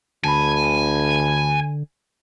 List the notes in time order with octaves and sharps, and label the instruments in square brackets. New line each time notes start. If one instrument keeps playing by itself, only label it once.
[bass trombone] D2 [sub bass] D3 [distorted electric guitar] G#5 [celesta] A5 B5